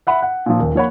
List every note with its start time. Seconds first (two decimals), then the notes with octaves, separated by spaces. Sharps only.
0.07 E5 F#5 B5
0.22 F#5
0.46 A#2 F3
0.60 D#1
0.75 F3 A#3 C#5 F#5 B5